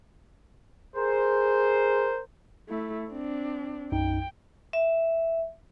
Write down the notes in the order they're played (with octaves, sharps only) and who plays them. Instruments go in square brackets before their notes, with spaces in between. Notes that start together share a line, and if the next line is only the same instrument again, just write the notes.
[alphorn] G#4 [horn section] A#4 C5
[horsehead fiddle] A3 E4
C4 D4
[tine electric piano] B1 F#2 D#4 [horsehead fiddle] G5
[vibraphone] E5